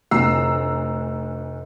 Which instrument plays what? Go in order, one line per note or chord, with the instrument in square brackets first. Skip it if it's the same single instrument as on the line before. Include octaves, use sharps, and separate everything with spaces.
[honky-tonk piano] F1 D2 A#5 E6 C7